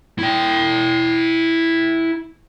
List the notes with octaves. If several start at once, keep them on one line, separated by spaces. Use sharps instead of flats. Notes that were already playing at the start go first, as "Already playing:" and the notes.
E4 G5